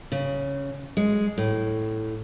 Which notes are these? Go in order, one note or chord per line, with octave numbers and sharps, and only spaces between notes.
C#3
G#3
A2